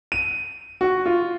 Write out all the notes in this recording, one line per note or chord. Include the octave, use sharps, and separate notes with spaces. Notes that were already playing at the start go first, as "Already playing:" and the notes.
D#7
F#4
F4